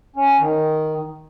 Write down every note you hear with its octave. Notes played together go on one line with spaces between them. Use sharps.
C#4
D#3